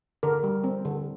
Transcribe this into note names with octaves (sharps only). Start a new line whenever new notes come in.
D3 A#4
G3
C4
D3